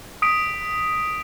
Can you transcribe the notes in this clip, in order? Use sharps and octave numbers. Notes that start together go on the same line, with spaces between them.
D#6 B6 D7